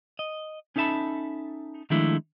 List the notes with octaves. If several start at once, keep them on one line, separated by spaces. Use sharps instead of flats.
D#5
C#4 D#4 A4 E5 A5 B5
D#3 F3 G#3 A3 D4 E4